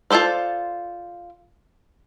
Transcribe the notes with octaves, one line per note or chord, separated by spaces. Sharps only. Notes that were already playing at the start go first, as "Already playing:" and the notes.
F4 G#4 A4 C5 D5